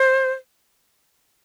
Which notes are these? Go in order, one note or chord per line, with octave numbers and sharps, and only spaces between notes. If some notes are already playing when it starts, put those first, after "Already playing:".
Already playing: C5